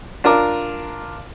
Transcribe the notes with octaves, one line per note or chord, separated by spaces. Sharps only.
D4 F4 A#4 A#5 D6